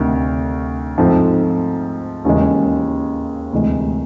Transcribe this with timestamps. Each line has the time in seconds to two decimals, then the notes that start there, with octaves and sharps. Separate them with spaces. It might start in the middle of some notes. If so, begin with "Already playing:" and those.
Already playing: D2 C3 D#3
0.98 G#2 F3 A3 C4
2.25 D#2 C#3 E3 G#3
3.53 D2 C3 E3 G#3